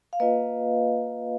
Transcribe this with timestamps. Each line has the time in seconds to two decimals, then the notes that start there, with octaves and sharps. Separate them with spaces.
0.13 F5
0.20 A#3 F4 B4 D#5